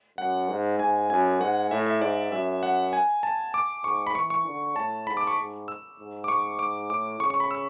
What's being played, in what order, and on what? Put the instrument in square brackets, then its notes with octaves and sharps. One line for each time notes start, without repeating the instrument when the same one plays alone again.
[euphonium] F#2 [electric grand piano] F#5
[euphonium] G#2
[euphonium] G#2 [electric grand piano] G#5
[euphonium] F#2 [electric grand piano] G#5
[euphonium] G#2 [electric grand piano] F#5
[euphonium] A2 [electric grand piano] E5
[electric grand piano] E5
[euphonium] G#2 [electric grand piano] D5
[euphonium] F#2 [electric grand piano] E5
[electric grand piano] F#5
G#5
A5
D6
[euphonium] G#2 [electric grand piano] C#6
[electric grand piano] B5
[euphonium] E3 [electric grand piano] C#6
[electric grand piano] C#6
[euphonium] D3
[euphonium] A2 [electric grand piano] A5
[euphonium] G#2 [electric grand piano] B5
[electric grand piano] D6
C#6
[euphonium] G#2
[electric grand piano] E6
[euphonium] G#2
[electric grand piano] D6
C#6
D6
[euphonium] A2 [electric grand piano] D6
[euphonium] C#3 [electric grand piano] C#6
[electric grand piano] C#6
B5
E6